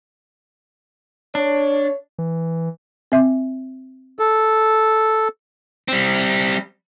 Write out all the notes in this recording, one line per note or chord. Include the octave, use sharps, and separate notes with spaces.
D4 C#5
E3
C4 E5
A4
G3 C4